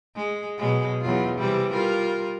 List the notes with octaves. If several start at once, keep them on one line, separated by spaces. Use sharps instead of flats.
G#3
B2 F#3 G#3
E2 F#3 F4
C3 E3 G3
G3 F4 A#4